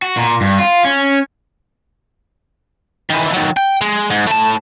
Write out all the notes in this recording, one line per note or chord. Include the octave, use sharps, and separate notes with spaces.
F#4
A#2
G2
F4
C#4
D#3 E3
D#3 F#3
G5
G#3
G#2
A2 A5